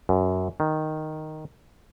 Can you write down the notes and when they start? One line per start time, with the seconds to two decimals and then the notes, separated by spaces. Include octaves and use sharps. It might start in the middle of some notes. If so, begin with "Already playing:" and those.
0.09 F#2
0.60 D#3